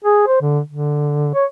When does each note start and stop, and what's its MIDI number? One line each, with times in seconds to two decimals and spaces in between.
0.04 0.24 68
0.27 0.39 72
0.41 0.59 50
0.69 1.29 50
1.34 1.45 73